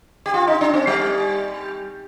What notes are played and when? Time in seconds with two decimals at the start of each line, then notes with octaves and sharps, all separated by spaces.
0.26 G4
0.34 F4
0.47 D#4
0.61 D4
0.73 C4
0.87 G3